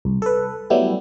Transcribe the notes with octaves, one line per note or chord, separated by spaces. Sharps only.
C2
A4 B4
F#3 G3 A3 B3 E4 G4